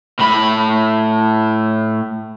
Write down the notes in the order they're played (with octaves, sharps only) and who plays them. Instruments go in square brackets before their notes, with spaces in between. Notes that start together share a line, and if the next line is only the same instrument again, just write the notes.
[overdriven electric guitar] A2 B5